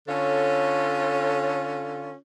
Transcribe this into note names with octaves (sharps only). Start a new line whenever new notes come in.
D3 C#4 F4 A4 C#5